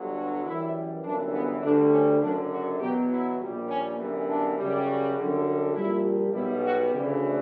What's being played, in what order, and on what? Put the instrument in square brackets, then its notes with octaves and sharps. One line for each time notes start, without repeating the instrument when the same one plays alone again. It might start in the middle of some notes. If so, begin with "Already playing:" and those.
Already playing: [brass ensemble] G1 G2 D3 F#3
F#4
F#2 E3 G3 E4
G1 F#2 E3 D4
B3
D2 D3 G3 D4
C#4
F#1 F#2 D3 D4
F#4
E2 B2 F#3 G4
E4
A#1 A#2 G3
C#4
G1 F#2 E3 G3
D4
F#2 C#3 G3
F#4
F#2 D3 G3
A#1 A#2 G3 E4
B1 B2 G3 E4
F#4
D2 C#3 E3 G4